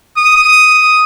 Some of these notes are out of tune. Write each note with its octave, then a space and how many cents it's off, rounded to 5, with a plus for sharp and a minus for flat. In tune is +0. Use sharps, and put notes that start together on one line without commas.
D#6 +5